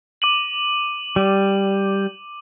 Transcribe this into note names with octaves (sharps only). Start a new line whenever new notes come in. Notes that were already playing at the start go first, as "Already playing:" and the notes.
D6 D#7 F#7
G3